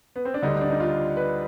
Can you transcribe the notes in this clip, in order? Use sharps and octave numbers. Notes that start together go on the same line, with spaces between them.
B3
C4
D4
D2 D3 G3 D#4
D4
D#4
F4
B4